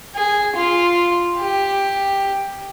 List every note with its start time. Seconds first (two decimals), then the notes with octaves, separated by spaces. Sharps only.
0.15 G#4
0.56 F4
1.39 G4